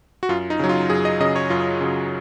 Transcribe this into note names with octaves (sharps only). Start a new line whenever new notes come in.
F#4
F#2 F4
D#4
C#3 F#3
F4
F#2 G#4
D#5
C#3 F#3 D#5
C#5
F#2 F4
C#3 F#3